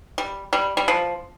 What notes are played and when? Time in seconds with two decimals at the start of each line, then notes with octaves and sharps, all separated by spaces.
0.18 G3
0.53 G3
0.77 G3
0.88 F3